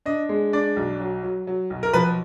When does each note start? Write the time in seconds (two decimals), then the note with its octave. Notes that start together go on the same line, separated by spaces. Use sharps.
0.06 D4 D#5
0.29 G#3
0.53 D4 D5
0.76 B1
1.00 F#3
1.23 F#3
1.47 F#3
1.70 B1
1.83 A#4
1.93 F3 B4